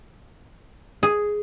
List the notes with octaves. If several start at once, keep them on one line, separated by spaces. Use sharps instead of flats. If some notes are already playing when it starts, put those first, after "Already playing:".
G#4